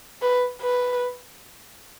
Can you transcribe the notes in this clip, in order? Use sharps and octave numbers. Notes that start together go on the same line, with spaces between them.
B4
B4